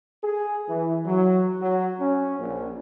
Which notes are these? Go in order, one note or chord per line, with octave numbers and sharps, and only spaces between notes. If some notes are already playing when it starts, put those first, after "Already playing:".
G#4
E3
F#3
F#3
C#4
A#1